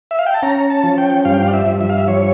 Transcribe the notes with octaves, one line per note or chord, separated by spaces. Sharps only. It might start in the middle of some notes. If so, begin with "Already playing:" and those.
E5
F5
G5
A5
C#4 A#5
A5
F3
G5
G2 F5
G5
F5
D5
E5
G2
E5
F5
E5
F3 C#5